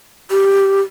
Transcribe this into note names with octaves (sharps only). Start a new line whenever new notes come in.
G4